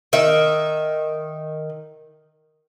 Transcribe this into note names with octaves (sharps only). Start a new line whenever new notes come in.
D#3 E5